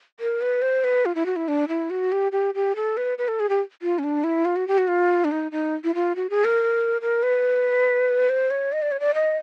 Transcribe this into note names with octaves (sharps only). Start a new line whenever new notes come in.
A#4
B4
C5
B4
F4
E4
F#4
E4
D4
E4
F#4
G4
G4
G4
A4
B4
B4
A4
G#4
G4
F4
C#4
D4
E4
F4
F#4
G4
F#4
F4
D4
D#4
D#4
E4
F4
F#4
G#4
A#4
A#4
B4
C5
C#5
D#5
D5
C#5
D5
D#5